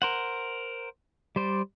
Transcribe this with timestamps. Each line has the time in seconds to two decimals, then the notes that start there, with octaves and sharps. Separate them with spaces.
0.02 A#4 C5 F#5
1.36 G3 C5 D5